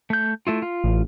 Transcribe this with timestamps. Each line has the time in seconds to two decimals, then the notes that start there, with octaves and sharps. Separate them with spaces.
0.10 A3 G6
0.47 A3 E4 F4
0.62 F4
0.84 A1